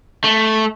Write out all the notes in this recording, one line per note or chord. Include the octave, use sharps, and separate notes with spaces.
A3